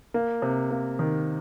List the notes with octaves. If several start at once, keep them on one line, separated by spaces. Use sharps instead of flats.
A#3
C3
A#3
D#3